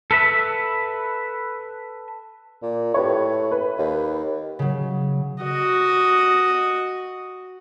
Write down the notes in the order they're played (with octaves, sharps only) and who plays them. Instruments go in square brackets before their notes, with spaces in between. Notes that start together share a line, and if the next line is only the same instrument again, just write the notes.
[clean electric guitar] A4 B4 E5
[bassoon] A#2
[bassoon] A2 [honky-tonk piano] G4 B4 C#5
[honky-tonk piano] B4
[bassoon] D#2
[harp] C#3 F#3
[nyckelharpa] F#4 D#5